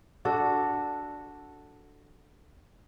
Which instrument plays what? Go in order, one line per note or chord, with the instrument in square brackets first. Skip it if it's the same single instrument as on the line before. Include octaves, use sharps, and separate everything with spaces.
[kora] D4 F#4 A4